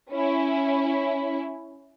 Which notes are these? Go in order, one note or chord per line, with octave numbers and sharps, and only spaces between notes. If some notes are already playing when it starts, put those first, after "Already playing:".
C#4 E4